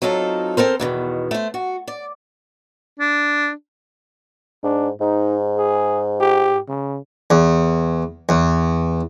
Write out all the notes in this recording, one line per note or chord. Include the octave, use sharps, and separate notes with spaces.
F#3 C4 D#4 F4 A4
C4 A4 A#4 C5
E2 B2 D3 D#3
A3 C5
F#4
D5
D4
G#2 D4
G#2 D#4
G#4
G4
C#3
E2
E2